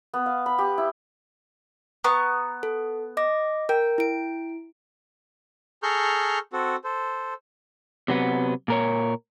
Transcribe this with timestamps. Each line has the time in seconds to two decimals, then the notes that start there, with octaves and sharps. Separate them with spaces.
0.14 B3
0.26 F5
0.46 B5
0.58 G4
0.78 E4
2.04 B3 A#5 C#6
2.63 A4
3.17 D#5 D6 A#6
3.69 A#4 G5
3.98 E4 D7
5.83 G#4 A4 A#5 C#6 F6 G6
6.53 C4 F#4 A4
6.84 A4 C5
8.08 C3 F#3 B3
8.68 A#2 A#4 C#5